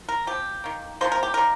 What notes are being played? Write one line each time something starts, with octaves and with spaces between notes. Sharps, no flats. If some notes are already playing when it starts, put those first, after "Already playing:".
A#4
F3 C4 G4
D#3 A#3
C3 F3 A#3 C5
A#4
G4
D#3 G3 A#3 A#4